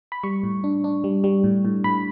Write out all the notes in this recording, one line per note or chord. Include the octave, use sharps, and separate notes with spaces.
B5
G3 C#6
A2
D4
D4
G3
G3
A2
A2
A2 B5